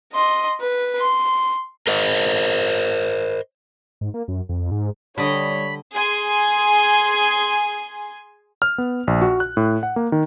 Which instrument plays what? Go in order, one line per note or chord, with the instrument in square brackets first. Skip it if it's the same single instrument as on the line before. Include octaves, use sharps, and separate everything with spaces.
[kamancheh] D#5 C6
B4
C6
[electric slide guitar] A#4 C5 D#5
[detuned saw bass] G#2
A#3
F#2
F2
G#2
[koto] D3 D#5 [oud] G3 [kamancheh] C#5 [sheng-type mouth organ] B5
[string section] G#4 G#5 C6
[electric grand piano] F6
B3
A#1
F#4
F#6
A2
F#5
A#3
D#3